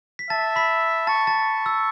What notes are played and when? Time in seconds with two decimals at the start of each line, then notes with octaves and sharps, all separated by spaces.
0.19 B6
0.30 E5 A5 A6
0.56 B5 B6
1.07 A5 C#6 A6
1.27 A5 A6
1.66 E6